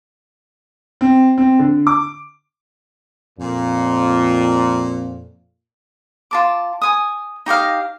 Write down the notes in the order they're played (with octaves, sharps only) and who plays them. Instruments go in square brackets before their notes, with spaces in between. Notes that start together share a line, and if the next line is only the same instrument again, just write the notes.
[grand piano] C4
C4
D3
D6
[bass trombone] F2 [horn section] A#2
[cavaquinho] F4 A5 D6
G#5 D#6
D#4 G4 D#5 F5